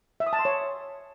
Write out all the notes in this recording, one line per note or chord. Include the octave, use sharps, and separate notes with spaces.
E5
D#6
A5
C6
C#5